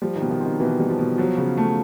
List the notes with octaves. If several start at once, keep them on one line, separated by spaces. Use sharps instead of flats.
F3 G3
D#3
B2
D#3
C4
D#3
B2 E3
G3
F3
B2
F3 F#3
C#3
A3